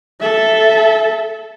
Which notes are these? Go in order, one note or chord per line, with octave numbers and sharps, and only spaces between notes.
A4 E5